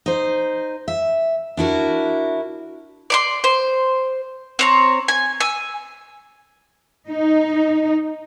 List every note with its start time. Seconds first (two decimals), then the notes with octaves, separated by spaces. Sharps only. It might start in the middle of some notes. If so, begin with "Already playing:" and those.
0.06 D#4 C5
0.88 E5
1.57 D4 E4 F#4 A#4
3.10 D5 B5 C6
3.44 C5
4.59 C4 C#5 A#5
5.08 G#5
5.40 G#5 E6
7.09 D#4